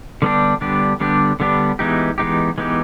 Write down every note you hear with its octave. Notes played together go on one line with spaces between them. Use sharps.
D3 G3 B3 D4 G4
D3 G3 B3 D4 G4
D3 G3 B3 D4 G4
D3 G3 B3 D4 G4
E3 G#3 B3 D#4 G4
E3 G#3 B3 D#4 G4
E3 G#3 B3 D#4 G4